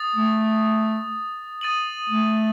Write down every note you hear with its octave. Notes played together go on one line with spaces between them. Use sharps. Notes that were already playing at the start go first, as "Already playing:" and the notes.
Already playing: D#6 A6
A3
D#6 A6 D#7 F#7
A3